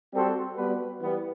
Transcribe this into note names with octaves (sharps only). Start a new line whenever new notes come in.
G3 C4 F#4 A4 C5
G3 B3 F#4 B4
E3 G3 B3